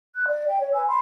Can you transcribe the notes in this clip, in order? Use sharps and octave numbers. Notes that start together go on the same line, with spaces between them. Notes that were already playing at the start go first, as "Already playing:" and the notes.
F#6
D5
G5
C#5
B4 G#5 E6
B5 C6